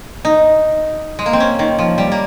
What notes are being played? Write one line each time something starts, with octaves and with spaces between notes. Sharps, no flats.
D#4
G#3
A#3
C4
C#4
D#3
F3
G3
A#3